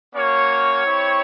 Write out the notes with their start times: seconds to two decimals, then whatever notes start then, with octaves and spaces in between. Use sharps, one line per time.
0.15 A#3 C#4 F#4 C#5
0.86 C4 E4 G4